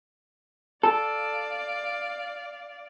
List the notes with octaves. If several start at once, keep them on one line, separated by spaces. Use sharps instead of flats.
A4 D5 F5